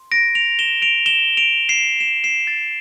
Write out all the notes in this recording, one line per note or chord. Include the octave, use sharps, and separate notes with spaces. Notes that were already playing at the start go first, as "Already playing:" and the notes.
Already playing: C6
A#6 D7
D7 F7
E7 G7
D7 F7
E7 G7
D7 F7
C7 E7
C7 E7
C7 E7
A6